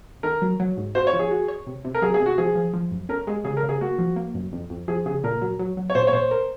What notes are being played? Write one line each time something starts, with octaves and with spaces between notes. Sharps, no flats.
D#3 A#4
F#3
F#3
G#2
F#4 C5
C#5
F3
G#4
F#4
C#5
C3
C3
A#4
F#3 G#4
G#4
C3
F#4
F3 G#4
F3
F3
F#2
C#4 A#4
G#3 G#4
C#3 G#4
A#4
C#3
G#4
A#3 F#4
F3
A#3
F#2
F2
F2
F3 G#4
C#3 G#4
A#2 A#4
F#3
F#3
F#3
C#5
A#2 C5
C#5
A#2 C5
A#4